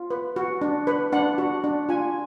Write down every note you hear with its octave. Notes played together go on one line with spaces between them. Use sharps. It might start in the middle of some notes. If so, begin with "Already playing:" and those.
Already playing: F4
B4
F#4
D4
B4
D4 F#5
F#4
D4
F4 G#5